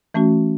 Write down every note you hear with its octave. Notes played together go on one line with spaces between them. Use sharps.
E3 A3 C#4 F#4